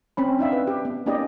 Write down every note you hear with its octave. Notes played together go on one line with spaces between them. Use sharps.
C4 C#4 B5
D4 D#4 E5 F5
B4
G4
B3
A#3 C#4 D#4 G4 D5 D#5